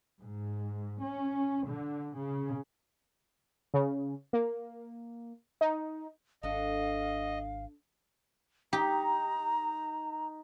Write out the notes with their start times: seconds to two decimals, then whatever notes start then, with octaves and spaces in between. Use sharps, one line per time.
0.20 G#2
1.01 C#4
1.65 D3
2.15 C#3
3.74 C#3
4.33 A#3
5.61 D#4
6.43 G#1 D4 A4 D#5 F5
8.73 D#4 G4 A#5